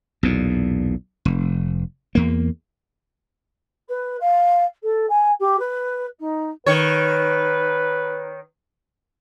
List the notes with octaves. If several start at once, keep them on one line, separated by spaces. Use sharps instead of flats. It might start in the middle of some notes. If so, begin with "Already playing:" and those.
B1 E2 A#2
F1
E2 A#3
B4
F5
A4
G#5
G4
B4
D#4
D#3 B4 C#5